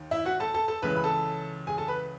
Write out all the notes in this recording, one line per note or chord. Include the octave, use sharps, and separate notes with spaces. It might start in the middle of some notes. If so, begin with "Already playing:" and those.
Already playing: D#2 D#3
E4 E5
F#4 F#5
A4 A5
A4 A5
A4 A5
C#2 C#3 E3 B4 B5
B5
A4 A5
G#4 G#5
A4 A5
B4 B5